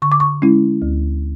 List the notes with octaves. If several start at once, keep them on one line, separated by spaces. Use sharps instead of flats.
D3 C#6
D6
C#6
G#3 C#4 E4
D2